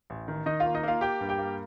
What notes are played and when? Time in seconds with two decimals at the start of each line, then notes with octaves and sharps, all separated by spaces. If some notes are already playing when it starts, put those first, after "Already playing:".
0.10 A1
0.28 D#3
0.46 D#3 D#4 D#5
0.60 F4 F5
0.66 A#3
0.75 D#4 D#5
0.83 A#3 F4 F5
1.01 A#3 G4 G5
1.21 G2
1.29 G4 G5
1.38 A#3